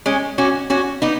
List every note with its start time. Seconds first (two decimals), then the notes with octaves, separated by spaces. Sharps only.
0.06 G#3 C#4
0.38 C#4 F#4
0.70 C#4 F#4
1.02 B3 D#4